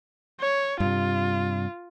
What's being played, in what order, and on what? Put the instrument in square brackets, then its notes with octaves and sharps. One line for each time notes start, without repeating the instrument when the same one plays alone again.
[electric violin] C#5
[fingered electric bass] G2 C3 [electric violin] F4